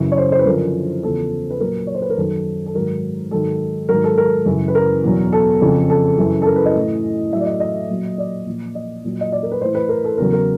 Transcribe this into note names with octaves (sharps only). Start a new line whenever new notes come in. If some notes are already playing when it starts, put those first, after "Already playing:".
Already playing: F#2 C#3 E3
C#5
C5
C5
B4
F#2 D3 F3 A#4
E2 C#3 F3 A4
B4
A#2 F#3 A#4
C#5
C5
B4
A#4
F#2 D#3 F#3 A4
A4
G#2 D#3 F#3 A#4
G#2 D#3 F#3 A4
G#2 D#3 F#3 A#4
A4
A#4
F#2 C#3 E3
B4
A#4
E2 B2 F#3
A4
F2 C#3 F3
A4
F#2 C#3 E3
A4
A#4
B4
D#5
A2 E3
A2 F#3 E5
D5
D#5
D#5
A#2 F#3
D5
A#2 F3
D#5
A#2 F#3
D#5
D5
A#4
B4
A2 E3 C5
B4
A#4
A4
E2 C#3 F#3 A#4
A#4